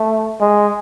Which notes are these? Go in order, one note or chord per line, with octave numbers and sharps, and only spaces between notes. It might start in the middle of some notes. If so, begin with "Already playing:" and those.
Already playing: A3
G#3